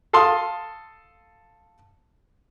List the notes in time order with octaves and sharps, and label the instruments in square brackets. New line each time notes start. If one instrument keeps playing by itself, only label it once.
[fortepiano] A4 F5 A5 C6 D#6